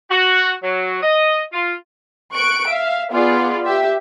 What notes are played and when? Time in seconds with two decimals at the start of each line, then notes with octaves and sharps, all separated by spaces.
0.11 F#4
0.63 F#3
1.02 D#5
1.53 F4
2.34 C#6 F#6 D7
2.67 E5 F5
3.12 B3 F4 G#4 D5
3.65 G4 E5